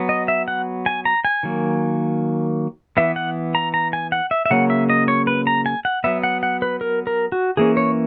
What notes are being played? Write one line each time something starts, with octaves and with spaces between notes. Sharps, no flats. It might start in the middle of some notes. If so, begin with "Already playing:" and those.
Already playing: F#3 B3
D#5
E5
F#5
G#5
A#5
G#5
D#3 F#3 A#3
E3 B3 E5
F#5
A#5
A#5
G#5
F#5
E5
E5
C#3 F#3 A#3 C#4 F#5
E5
D#5
C#5
B4
A#5
G#5
F#5
F#3 B3 E5
F#5
F#5
B4
A#4
A#4
F#4
E3 A#3 C#4 G#4
C#5